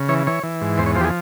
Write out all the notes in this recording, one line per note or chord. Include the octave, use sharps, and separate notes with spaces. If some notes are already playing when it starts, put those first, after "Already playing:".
Already playing: C#3
E3 C#5
E3 C#5
E3
G#2
E2 C5
C#5
F3 C5
G4
G#4